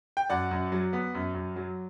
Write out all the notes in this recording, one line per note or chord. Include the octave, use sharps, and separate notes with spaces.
G5
F#2 D5 F#5
F#2
F#3
B3
F#2
F#2
F#3